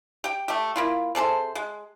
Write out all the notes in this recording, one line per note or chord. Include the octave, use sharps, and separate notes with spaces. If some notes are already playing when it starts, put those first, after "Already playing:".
G4 G5
A3 G4
A#3 E4 F4
C3 G#4 A4 C5
G#3